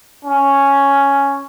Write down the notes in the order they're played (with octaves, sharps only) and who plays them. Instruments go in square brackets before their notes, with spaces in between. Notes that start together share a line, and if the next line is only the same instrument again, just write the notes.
[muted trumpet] C#4